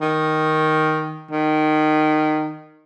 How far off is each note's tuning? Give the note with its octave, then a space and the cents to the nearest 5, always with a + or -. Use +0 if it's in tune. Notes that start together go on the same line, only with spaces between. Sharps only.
D#3 +0
D#3 -15